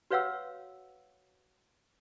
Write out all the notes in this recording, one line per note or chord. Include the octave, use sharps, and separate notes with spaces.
F#4 B4 C#5 F5 F#5 E6